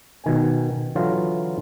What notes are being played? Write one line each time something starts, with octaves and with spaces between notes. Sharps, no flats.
B2 D#3 G#5
D3 E3 F#3 F4